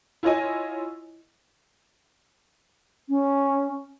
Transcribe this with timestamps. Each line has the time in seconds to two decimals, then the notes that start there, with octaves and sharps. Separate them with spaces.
0.23 E4 F4 C#5 D#5 G#5
3.09 C#4